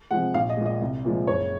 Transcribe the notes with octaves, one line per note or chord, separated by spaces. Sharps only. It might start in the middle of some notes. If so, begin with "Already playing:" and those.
C3 F3 G#3 F#5
A#1 F5
D#5
A#2 G#3
D#5
C2
A#2 F3 G#3
F#1 C#5